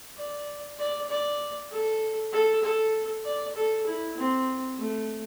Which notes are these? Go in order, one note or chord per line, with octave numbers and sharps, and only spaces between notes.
D5
D5
D5
A4
A4
A4
D5
A4
E4
C4
A3